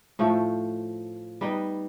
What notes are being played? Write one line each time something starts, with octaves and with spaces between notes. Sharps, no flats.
A2 F3 A3
G3 B3 D#4